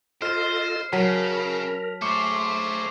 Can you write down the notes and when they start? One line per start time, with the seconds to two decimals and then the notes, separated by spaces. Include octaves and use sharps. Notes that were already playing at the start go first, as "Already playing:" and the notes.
0.22 F4 A4 C5 D#5 F6
0.93 C#3 F#3 A#4 A5 B6
2.02 A3 G#4 C5 C#6 D6 C#7